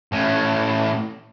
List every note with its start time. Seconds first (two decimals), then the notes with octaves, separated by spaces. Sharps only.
0.12 A2 C#4